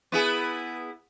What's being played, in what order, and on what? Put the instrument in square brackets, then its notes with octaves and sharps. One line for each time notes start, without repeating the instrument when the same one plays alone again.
[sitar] B3 E4 G#4